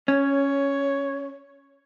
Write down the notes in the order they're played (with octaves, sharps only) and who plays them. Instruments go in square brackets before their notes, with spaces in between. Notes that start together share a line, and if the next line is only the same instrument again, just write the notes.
[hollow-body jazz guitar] C#4 [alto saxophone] C#5